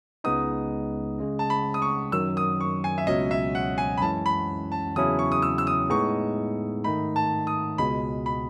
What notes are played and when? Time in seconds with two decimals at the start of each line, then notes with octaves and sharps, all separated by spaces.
0.24 C#2 C#3 G#3 B3 D#4 D#6
1.19 C#3 G#3 C#4
1.39 A5
1.50 B5
1.74 D#6
1.82 C#6
2.12 F#2 D#3 F#3 E6
2.37 D#6
2.61 C#6
2.84 G#5
2.98 E5
3.07 C#2 B2 F#3 C#4 D#5
3.31 E5
3.55 F#5
3.78 G#5
3.98 B5
4.01 F#2 E3 G#3 C#4 E4 A5
4.26 B5
4.72 A5
4.96 E2 C#3 F#3 C#4 E4 D#6
5.19 C#6
5.32 D#6
5.42 E6
5.58 E6
5.67 D#6
5.90 A2 G#3 B3 D#4 G#4 C#6
6.84 G#2 D#3 A3 D#4 B5
7.16 A5
7.47 D#6
7.78 C#2 B2 G#3 B5
8.26 B5